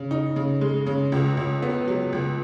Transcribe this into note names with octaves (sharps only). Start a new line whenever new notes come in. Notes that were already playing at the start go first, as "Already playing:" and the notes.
Already playing: C#3
D#4
C#3
G#3
C#3
C#2
C#2
B3
F#3
C#2